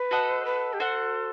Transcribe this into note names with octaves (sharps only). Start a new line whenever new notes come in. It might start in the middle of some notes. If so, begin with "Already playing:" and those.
Already playing: B4
F#4 A4 D#5 F#5
C5
B4
G4
F#4 A4 C5 F#5